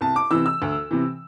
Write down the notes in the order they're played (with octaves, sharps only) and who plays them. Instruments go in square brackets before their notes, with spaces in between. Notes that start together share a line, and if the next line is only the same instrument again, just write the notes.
[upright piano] C2 A5
D6
C3 E3 E6
E6
D2
C3 E3